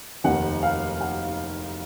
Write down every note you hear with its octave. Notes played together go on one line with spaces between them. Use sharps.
F1 D#2 D#3 F#5
F5
F#5